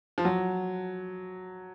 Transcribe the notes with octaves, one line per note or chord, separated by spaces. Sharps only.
F3
F#3